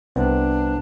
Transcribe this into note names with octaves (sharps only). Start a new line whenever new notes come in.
C2 B3 C4 D4